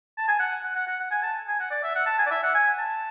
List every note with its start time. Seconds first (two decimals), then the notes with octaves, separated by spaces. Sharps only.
0.18 A5
0.28 G#5
0.40 F#5
0.64 F#5
0.76 F#5
0.87 F#5
1.00 F#5
1.11 G#5
1.23 A5
1.48 G#5
1.60 F#5
1.71 D5
1.83 E5
1.96 F#5
2.07 A5
2.19 G#5
2.27 D5
2.31 E5
2.43 F#5
2.55 G#5
2.79 A5